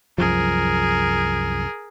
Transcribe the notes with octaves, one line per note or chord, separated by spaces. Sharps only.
C2 F#2 F3 G#4 A#4